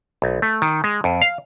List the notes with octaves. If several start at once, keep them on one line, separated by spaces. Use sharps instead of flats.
B1
A3
D#3
G#3
F2
F5